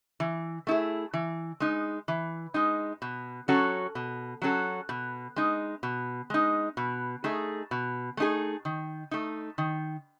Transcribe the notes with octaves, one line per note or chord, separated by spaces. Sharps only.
E3
A3 E4 G#4
E3
G#3 D#4
E3
G#3 D#4
B2
F#3 C#4 F#4 A4
B2
F#3 C#4 F#4 A4
B2
G#3 D#4
B2
G#3 D#4
B2
A3 D#4 G#4
B2
A3 D#4 G#4
D#3
A3 D#4
D#3